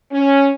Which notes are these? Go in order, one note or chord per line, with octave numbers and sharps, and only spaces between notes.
C#4